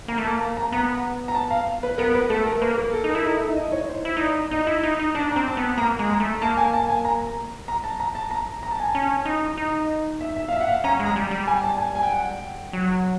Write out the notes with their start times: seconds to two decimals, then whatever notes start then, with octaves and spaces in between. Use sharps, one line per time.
0.08 A#3 A#5
0.18 A3
0.25 A#3 A5
0.41 A5
0.57 A#5
0.72 B3 A#5
1.28 A#5
1.35 A5
1.51 F5
1.83 B4
1.98 B3 A#4
2.15 B4
2.30 A3 A4
2.46 A#4
2.62 A#3 B4
2.78 A#4
2.93 A4
3.04 D#4
3.10 A#4
3.15 E4
3.25 D#4 A4
3.37 E4 A4
3.49 D#4
3.57 D#5
3.60 E4
3.72 D#4 C#5
3.82 E4
3.89 C5
3.94 D#4
4.05 E4
4.17 D#4 D5
4.51 D#4 D#5
4.67 E4
4.83 D#4
4.99 D#4
5.15 D4 A5
5.31 A#5
5.36 C4
5.47 A5
5.57 B3
5.78 A#3 A#5
5.99 G#3
6.09 A#5
6.20 A3
6.41 A#3 A5
6.57 G#5
6.73 A5
6.89 G#5
7.05 A#5
7.68 A#5
7.84 A5
8.00 A#5
8.15 A5
8.31 A#5
8.63 A#5
8.71 A5
8.80 G#5
8.88 A5
8.95 C#4
9.25 D#4
9.57 D#4
10.21 E5
10.36 E5
10.48 F5
10.53 E5
10.61 F#5
10.68 F5
10.84 C#4 A#5
10.99 G#3
11.05 A#5
11.16 G3
11.31 G3
11.47 G#5
11.64 A5
11.78 G#5
11.95 G#5
12.03 G5
12.12 F#5
12.21 G5
12.73 F#3